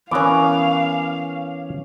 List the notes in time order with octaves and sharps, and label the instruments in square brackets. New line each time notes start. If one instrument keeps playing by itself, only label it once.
[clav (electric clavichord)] E3 B3 A#4 [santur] C#4 D6 [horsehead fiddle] F5